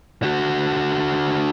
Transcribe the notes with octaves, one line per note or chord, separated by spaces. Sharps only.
D3 F#4